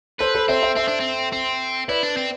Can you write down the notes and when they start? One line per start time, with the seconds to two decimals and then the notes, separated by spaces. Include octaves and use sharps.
0.20 A4 B4 C5
0.35 A4 C5
0.48 C4 C5 E5
0.63 C5 E5
0.76 C4 C5 E5
0.88 D4
1.00 C4
1.32 C4
1.88 E4 B4 D5
2.03 D4
2.17 C4